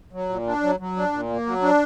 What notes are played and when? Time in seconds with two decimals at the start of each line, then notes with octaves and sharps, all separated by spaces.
0.13 F#3
0.29 A#2
0.47 D4
0.62 F#3
0.80 F#3
0.96 D4
1.13 A#2
1.29 A#3
1.46 F#3
1.62 D4